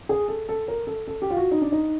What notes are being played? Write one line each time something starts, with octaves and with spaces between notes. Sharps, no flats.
G#4
A4
A4
A#4
A4
A4
G4
F4
F#4
D#4
D4
D#4